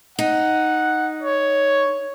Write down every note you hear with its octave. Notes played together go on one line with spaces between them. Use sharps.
D#4 F#5
C#5